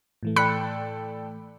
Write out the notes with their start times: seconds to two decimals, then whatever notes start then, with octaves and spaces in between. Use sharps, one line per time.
0.23 A2 E3 A3
0.36 A4 D5 G5 B5 F#6 C#7